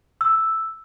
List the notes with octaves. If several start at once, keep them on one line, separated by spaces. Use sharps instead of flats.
E6